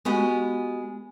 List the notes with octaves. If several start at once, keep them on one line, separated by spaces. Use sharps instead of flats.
G#3 B3 F#4 G4